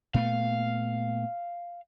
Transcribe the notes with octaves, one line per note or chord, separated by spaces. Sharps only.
A#2 A3 B3 F5